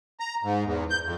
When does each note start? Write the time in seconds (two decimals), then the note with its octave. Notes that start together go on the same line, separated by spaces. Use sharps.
0.20 A#5
0.43 G#2
0.66 E2
0.90 G6
1.04 F2